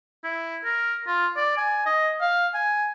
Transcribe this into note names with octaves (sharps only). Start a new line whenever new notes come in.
E4
A#4
F4
D5
G#5
D#5
F5
G#5